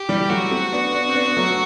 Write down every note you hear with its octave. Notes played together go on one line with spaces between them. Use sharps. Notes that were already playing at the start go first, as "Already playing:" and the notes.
Already playing: G4
E3 G3
F#3 A3 F#4
A3 C4
B3 D4
B3 D4
C4
B3 D4
B3
F#3 A3